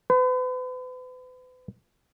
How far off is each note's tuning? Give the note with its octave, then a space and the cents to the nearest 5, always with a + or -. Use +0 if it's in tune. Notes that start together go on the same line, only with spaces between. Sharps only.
B4 +40